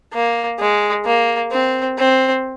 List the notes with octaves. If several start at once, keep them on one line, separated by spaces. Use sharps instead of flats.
A#3
G#3
A#3
C4
C4